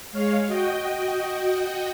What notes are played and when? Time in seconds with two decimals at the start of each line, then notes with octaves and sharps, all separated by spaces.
0.11 G#3 C#5 F5
0.47 F#4 D#5 G5